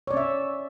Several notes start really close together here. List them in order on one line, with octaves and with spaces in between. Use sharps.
C#5 D5 C#4 E5